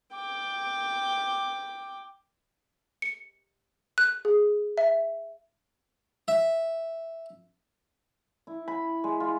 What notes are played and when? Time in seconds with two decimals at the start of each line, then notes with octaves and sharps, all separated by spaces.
0.16 G5 D6
3.02 C#7
3.98 F#6
4.25 G#4
4.78 E5
6.28 E5
8.47 E4
8.68 B5
9.04 G#3
9.20 F4